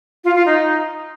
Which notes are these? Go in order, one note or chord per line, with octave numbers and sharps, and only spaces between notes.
F4
F4
D#4